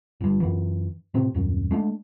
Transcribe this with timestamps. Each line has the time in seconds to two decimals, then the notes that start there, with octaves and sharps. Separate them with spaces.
0.21 G1 G2
0.40 F#2 E3
1.14 A2 C3 C4
1.34 D#1 F#2
1.71 G#3 A3 B3 D4